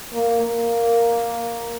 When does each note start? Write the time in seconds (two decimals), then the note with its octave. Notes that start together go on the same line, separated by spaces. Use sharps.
0.13 A#3
0.43 A#3